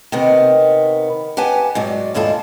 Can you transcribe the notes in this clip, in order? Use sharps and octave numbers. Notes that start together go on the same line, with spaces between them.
C3 D#3 B3
G4 B4 F#5 G#5 A5
G#2 F#3 D5
D#2 G#2 E4 F4 A4